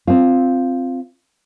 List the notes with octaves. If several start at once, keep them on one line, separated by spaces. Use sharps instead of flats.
C4 F4